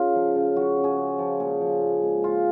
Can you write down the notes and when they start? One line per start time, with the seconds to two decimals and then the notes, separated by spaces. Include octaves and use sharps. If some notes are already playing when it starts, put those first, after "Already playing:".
Already playing: C#3 F4
0.15 F3
0.35 C#3
0.56 F3 F#4
0.78 C#3
0.84 G#4
0.98 C#3
1.19 F3
1.40 A#2 G#4
1.61 F3
1.81 A#2
2.02 G#3
2.23 G#3 F4